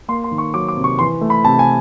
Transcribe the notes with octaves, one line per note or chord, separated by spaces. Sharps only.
A#3 C6
C6
D#3
C#6
F#3 D6
D6
C3
C#6
E3 C6
A3
B5
C3 A5
G#5